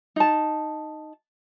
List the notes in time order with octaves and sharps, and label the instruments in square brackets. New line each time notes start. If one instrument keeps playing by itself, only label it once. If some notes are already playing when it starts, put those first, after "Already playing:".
[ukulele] D#4 A5